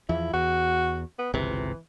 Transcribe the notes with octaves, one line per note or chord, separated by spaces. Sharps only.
E2 F3 E4
E2 F#4
B3
G1 C#2 C3 E3